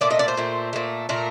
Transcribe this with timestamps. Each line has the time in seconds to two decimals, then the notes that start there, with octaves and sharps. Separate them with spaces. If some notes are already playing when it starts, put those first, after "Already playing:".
0.01 A#2 A3 D5
0.11 D#5
0.19 D5
0.28 C5
0.37 A#2 A3
0.73 A#2 A3
1.09 A#2 A3 A#4